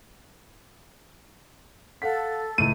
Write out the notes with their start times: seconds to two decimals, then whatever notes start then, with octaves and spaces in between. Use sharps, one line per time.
2.02 A4 F5 F#5 B6
2.58 C#2 A2 D#7